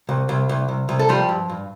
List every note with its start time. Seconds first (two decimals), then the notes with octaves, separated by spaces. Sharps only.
0.09 C2
0.29 C2
0.49 C2
0.69 C2
0.89 C2
0.99 A4
1.09 F3 G3 G4
1.29 G2
1.49 G2